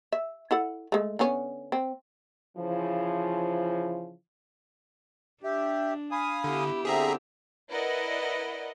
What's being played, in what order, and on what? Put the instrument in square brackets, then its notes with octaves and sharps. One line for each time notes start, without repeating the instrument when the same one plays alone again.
[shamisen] E5
E4 A4 F#5
G#3 A3
D3 B3 C#4
C4
[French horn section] C#3 E3 F3
[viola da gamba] D4 [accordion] G4 [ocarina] E5
[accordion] F5 G#5 D#6 [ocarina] B5
[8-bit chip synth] D3 [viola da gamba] B3 E4 G4
[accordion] D3 C4 [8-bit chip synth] G#4 E5 A#5
[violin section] E4 A#4 B4 D5 D#5 F#5